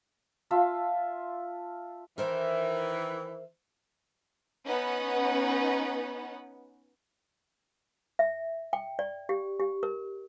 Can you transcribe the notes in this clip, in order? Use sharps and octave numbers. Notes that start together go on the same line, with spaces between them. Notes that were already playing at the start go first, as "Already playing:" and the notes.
F4 E5 A5 C6
D#3 E3 A#4 C5 E5
B3 C#4 D#4 B4 F#5
E5
G5
D5
G4
G4
A#4